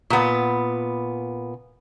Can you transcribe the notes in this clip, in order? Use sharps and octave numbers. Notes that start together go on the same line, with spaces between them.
A#2 B3